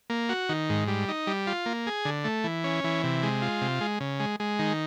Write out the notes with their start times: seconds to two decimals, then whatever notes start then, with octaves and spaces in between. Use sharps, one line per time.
0.10 A#3
0.29 F#4
0.49 D#3
0.69 G#2
0.88 G3
1.08 D#4
1.27 G3
1.47 F4
1.66 A#3
1.87 G#4
2.05 D3
2.24 A3
2.44 E3
2.64 C#4
2.84 E3
3.04 C3
3.23 G#3
3.42 F4
3.61 C3
3.81 G#3
4.00 C#3
4.20 G#3
4.40 G#3
4.59 D#3